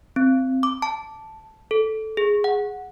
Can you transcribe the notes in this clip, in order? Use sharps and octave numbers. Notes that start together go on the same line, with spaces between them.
C4
D6
A5
A4
G#4
F#5